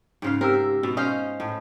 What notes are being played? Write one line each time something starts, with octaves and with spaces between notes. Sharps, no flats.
G#2 C#3 F5
C4 G4 A#4 E6
B2
C#4 C5 D#5 F5
A2